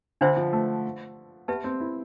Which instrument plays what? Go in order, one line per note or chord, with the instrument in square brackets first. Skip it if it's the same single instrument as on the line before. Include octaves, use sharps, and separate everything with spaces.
[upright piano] D3 [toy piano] D4 F4 C5 E5
[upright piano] F3
A3
[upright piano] B3 [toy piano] G4 B4 E5 A5
[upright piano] C4
E4